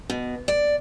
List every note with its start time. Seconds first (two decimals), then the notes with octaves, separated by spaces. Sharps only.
0.10 B2
0.48 D5